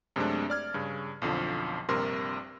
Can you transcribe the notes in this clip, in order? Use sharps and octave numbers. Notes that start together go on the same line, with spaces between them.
F#2 C3 G#3 A3 C4 D4
D5 F6 G#6
G2 C#3
B1 F2 D3 F3
A#1 G2 C3 A#4 C6